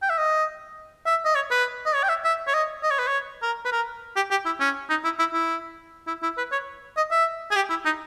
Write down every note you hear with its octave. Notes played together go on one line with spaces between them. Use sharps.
G5
E5
D#5
E5
D#5
C#5
B4
D#5
C#5
G5
E5
E5
C#5
D#5
D#5
C#5
B4
C#5
A#4
B4
A#4
G4
G4
E4
C#4
D#4
E4
E4
E4
E4
E4
B4
C#5
D#5
E5
G#4
G4
E4
D#4